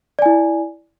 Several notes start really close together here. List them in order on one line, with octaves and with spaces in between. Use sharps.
D5 G#5 E4